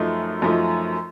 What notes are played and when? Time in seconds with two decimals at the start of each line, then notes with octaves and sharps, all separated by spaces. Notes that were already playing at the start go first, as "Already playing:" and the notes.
Already playing: F#2 F3 A3 D#4
0.42 F#2 F3 A3 D#4